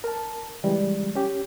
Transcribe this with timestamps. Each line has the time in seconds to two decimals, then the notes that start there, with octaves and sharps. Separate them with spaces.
0.04 A#4 A5
0.64 C#3 E3 G3 G#3
1.15 C#4 G4